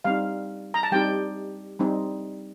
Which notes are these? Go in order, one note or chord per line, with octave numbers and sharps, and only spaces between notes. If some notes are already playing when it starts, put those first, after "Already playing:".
G3 C4 D#4 F5
A#5
A5
G3 C4 D#4 G4 G5
G3 C4 D#4